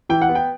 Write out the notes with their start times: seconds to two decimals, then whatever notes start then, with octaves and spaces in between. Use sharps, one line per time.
0.09 E3 G5
0.21 F#5
0.29 B3
0.35 G5